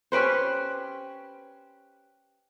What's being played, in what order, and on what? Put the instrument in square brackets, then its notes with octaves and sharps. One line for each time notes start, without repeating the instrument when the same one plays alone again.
[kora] C#4 G4 B4 C5